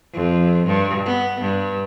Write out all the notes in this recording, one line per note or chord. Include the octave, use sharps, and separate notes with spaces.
F2
G2
B3
G2